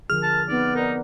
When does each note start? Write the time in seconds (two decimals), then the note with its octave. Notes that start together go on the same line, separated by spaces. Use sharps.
0.10 D3 F3 G#4 A#4 F6
0.23 A5
0.49 B3 C4 D#4 D5
0.75 D#4 A#4 D5